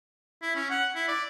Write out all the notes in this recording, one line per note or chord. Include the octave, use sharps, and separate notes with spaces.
E4
C#4
F#5
E4
D5